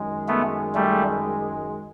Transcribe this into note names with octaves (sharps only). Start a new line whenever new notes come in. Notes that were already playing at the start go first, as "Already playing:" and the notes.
Already playing: F#2 D#3 G#3
A3 B3
G3 A3